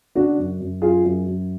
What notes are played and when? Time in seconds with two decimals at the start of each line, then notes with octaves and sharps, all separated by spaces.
0.15 C#3 D4 F#4
0.38 F#2
0.60 F#2
0.82 F#2 F4 G#4
1.05 F#2
1.26 F#2